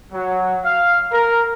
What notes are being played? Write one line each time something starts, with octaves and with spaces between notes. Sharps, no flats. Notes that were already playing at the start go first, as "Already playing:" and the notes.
F#3
F5
A#4